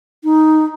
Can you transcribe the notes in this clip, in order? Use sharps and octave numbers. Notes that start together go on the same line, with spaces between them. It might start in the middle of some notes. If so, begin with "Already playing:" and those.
D#4